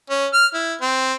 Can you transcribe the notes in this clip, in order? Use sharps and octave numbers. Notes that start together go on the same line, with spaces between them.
C#4
F6
E4
C4